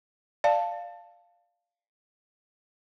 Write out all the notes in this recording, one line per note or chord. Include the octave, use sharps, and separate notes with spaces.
D5 F5 A5